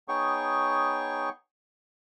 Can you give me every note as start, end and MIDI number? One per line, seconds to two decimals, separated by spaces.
0.08 1.29 59
0.08 1.29 63
0.08 1.29 68
0.08 1.29 73
0.08 1.29 79
0.08 1.29 85